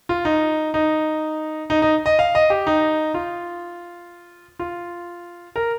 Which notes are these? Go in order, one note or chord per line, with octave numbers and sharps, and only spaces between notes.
F4
D#4
D#4
D#4
D#4
D#5
F5
D#5
G4
D#4
F4
F4
A#4